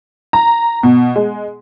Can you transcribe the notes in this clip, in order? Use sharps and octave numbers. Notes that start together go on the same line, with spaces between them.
A#5
B2
G#3